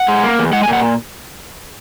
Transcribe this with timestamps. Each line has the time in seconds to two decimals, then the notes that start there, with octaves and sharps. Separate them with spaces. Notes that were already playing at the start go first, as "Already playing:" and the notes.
Already playing: F#5
0.08 G#3
0.23 A#3
0.39 E2
0.53 G#3 F#5
0.63 G#5
0.68 A#2
0.73 F#5